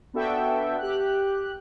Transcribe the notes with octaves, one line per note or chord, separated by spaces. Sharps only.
B3 D4 F#4 A4 E5 G5
G4 F#6